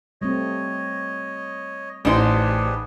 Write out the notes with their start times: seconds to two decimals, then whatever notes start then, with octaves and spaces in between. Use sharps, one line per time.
0.21 G3 A3 C4 C#5 D#5
2.05 A1 D4 D#4 G4 G#4 B4 C5